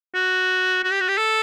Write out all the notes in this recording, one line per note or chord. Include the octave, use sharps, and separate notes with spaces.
F#4
F#4
G4
F#4
G4
A4